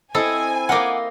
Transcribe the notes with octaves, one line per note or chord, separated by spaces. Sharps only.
C4 E4 A4 D#5 G#5
A#3 D#4 F4 F#5 D6